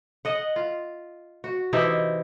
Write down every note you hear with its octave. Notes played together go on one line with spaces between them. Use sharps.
D#5 F#5
F4
F#4
C3 E3 D#4 E5